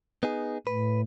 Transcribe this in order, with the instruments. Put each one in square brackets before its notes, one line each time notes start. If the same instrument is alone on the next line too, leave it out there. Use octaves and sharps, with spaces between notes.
[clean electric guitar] B3 D#4 G#4
[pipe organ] A2 [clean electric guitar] B4